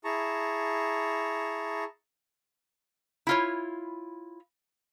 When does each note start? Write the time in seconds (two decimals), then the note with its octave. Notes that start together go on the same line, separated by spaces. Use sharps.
0.04 E4 G#4 A5 A#5 C#6
3.27 E4 F4 C#5